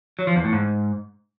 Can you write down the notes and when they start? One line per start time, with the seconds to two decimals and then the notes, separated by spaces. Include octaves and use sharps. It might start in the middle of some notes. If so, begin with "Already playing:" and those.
0.19 F#3
0.27 F3
0.36 E2
0.44 A2
0.53 G#2